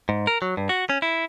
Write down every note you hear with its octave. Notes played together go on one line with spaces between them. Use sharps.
G#2
A#4
F#3
G2
F#4
C#4
E4